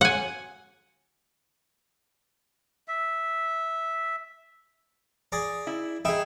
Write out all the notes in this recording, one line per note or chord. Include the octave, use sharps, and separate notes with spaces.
F#5 G#5
E5
G#4 D5 A#5
E4
D#4 G#4 E5 G5 B5